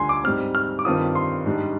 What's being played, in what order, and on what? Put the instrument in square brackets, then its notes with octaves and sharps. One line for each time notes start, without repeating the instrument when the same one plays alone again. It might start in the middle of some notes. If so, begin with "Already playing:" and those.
Already playing: [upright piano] D2 D3 G3 D4 F4 [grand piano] G#5 C6
[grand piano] D6
[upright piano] G#2 G3 C4 [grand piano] F6
[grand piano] F6
D6
[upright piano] G2 D#3 G3 C4 F4 [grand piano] D#6
[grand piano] C6
[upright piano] G#2 G3 D4